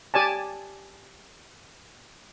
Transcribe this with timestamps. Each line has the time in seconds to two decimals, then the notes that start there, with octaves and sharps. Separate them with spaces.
0.14 G4 D5 G#5 A5